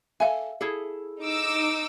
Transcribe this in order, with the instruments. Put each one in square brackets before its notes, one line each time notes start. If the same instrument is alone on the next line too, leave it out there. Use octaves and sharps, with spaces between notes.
[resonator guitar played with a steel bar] A4 G#5 [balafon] E5 F5
[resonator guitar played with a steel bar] E4 G#4 A4
[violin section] D#4 D6 E6